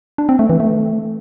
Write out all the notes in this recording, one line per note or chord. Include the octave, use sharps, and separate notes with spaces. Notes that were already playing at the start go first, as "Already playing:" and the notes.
D4
C4
A3
E3
A3